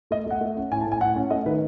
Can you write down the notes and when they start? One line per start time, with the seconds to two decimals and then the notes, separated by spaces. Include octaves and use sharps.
0.11 A3 D#5
0.26 A3 F#5
0.41 A3
0.57 C#4
0.72 A2 G#5
0.81 A5
0.86 A2
0.92 G#5
1.01 A2 F#5
1.16 C#4
1.30 A3 D#5
1.46 D#3 B4